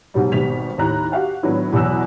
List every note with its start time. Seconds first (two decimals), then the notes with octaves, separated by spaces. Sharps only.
0.14 G#2 B2 F#3 G3
0.32 G#1 B2 G3 B6 F7
0.78 D#2 A2 D#4 A#5 F#6
1.12 F#4 G4 F5 F#5
1.43 A2 D#3 F#3 B3 D4
1.73 E2 B2 F#3 E6 F#6